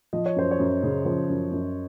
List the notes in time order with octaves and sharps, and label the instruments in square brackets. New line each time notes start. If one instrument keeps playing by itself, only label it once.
[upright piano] F3 [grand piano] D#5
[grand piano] C#5
[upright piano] F#2 [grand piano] C5
[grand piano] C#5
[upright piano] F#2
C#3
[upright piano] F3 [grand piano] C5
[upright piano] F#2
F#2